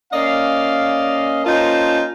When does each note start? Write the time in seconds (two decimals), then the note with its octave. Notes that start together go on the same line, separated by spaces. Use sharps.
0.13 A#3 C#4 D5 D#5 F5
1.45 A#3 C#4 D#4 F4 C5 A5